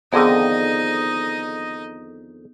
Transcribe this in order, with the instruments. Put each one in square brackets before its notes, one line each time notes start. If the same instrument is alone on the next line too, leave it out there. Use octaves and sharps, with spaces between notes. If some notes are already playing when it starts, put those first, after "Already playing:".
[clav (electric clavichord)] F2 D3 D#3 [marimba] B3 G#4 [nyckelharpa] D#4 D#5